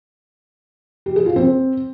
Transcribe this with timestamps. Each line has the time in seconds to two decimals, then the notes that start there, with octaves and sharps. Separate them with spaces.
1.06 G4
1.16 G#4
1.26 F4
1.36 C4